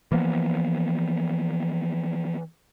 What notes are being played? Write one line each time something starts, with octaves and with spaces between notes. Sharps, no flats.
E3 F3 A#3 B3